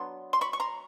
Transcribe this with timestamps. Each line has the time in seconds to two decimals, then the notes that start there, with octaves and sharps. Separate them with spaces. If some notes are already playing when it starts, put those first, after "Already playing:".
Already playing: F#3 B3 D4 C6
0.33 C6
0.41 B5 C#6
0.53 C#6
0.60 A#5 C6